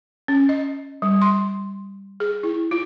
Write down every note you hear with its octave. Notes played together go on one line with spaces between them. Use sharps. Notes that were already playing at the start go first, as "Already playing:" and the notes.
C#4
D#5
G3
C6
G#4
E4
F4